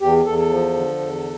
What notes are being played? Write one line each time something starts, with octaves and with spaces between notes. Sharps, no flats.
E2 G4
E2 A4
A4
F3
D3
E2